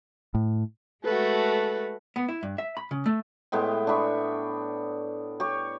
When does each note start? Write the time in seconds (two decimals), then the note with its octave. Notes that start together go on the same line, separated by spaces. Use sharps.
0.35 A2
1.05 G#3 A3 F#4 A4 B4
2.16 B3
2.29 E4
2.43 G2
2.58 E5
2.77 B5
2.91 C#3
3.06 A3
3.52 A2 G#3 B3 G5
3.87 D4 E5 B5 C#6
5.40 G4 C#5 C#6